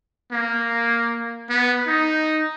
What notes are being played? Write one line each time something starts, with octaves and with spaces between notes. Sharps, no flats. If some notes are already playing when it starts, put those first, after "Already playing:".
A#3
B3
D#4